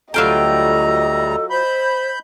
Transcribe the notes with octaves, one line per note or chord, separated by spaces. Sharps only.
D2 F#3 G3 F4 A4 D#5 G5 A#5
C5 B5 G6